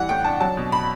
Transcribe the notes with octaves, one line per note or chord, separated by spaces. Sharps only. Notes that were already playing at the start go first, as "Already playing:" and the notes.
Already playing: E3 G3 F#5
A2 G5
D4 A5
F#3 A5
B2
B5